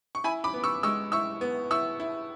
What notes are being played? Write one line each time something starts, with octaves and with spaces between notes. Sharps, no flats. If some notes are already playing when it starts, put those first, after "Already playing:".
C#6
E4 G#5 B5
B5 D6
B3
C#6 E6
G#3 C#6 E6
E4 C#6 E6
B3
E4 C#6 E6
E4